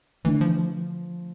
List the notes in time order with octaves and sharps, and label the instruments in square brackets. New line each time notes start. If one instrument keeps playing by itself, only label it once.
[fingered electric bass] D3 A3 D4 [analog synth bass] E3
[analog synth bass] F3
E3
F3